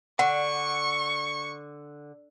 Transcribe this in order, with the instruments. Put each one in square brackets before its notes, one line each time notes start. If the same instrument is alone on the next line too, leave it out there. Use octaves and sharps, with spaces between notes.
[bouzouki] D3 [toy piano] F#5 [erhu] C#6